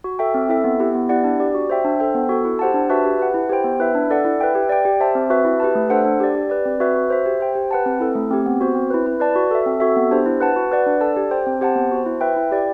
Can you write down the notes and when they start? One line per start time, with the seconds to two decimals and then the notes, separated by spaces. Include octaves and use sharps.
0.04 F#4
0.19 A4 E5 G5
0.34 C4
0.49 E4 A4 E5
0.64 B3
0.80 E4 G4
0.95 B3
1.09 E4 G4 D5 F#5
1.24 D4
1.40 G4 D5
1.55 F#4
1.70 C5 E5 G5
1.84 D4
2.00 A4 C5 G5
2.15 B3
2.29 F#4 A4
2.45 E4
2.59 G4 C5 F#5 A5
2.74 D4
2.90 F#4 B4 E5 A5
3.05 G4
3.19 B4 F#5
3.34 E4
3.49 G4 C5 G5
3.64 B3
3.80 E4 B4 E5
3.95 D4
4.10 A4 D5 F#5
4.25 E4
4.40 B4 E5 G5
4.55 G4
4.69 D5 G5
4.85 G4
5.00 C5 E5 A5
5.15 C4
5.30 F#4 B4 E5
5.45 E4
5.60 G4 B4 E5 A5
5.75 A3
5.90 D4 A4 C5 F#5
6.05 D4
6.20 G4 D5
6.35 G4
6.50 B4 D5
6.65 C4
6.80 F#4 B4 E5
6.95 F#4
7.10 C5 E5
7.26 G4
7.40 C5 G5
7.55 G4
7.71 B4 F#5 A5
7.86 C4
8.00 E4 A4
8.15 A3
8.31 C4 G4
8.46 B3
8.61 F#4 C5
8.75 C4
8.90 E4 B4
9.06 E4
9.20 B4 D5 A5
9.36 F#4
9.51 A4 E5
9.66 C4
9.80 F#4 A4 E5
9.96 B3
10.11 D4 G4 C5
10.26 E4
10.41 B4 F#5 A5
10.56 F#4
10.72 B4 D5 F#5
10.86 D4
11.01 A4 D5 A5
11.16 G4
11.31 C5 G5
11.46 C4
11.61 G4 C5 F#5 A5
11.75 B3
11.91 F#4 C5
12.06 E4
12.21 B4 E5 G5
12.37 E4
12.52 G4 D5 G5